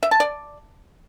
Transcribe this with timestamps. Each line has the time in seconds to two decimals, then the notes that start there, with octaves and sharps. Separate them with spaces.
0.03 E5
0.11 A5
0.20 D5